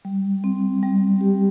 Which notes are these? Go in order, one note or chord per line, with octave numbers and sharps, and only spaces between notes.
G3
C4
G3
G4